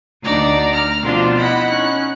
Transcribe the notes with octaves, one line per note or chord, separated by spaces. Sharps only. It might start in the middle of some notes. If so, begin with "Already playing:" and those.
D2 D4 D#4 D5 A#5
A#5 F6
B2 F3 C4 D4 F4
E4 D#5 F#5 B5
C#4 D#4 F#6